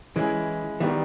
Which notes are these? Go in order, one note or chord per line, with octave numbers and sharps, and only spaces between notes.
E3 G#3 C#4 E4 G#4
D#3 E3 G3 B3